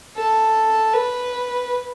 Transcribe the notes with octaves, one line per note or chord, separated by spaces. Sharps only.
A4
B4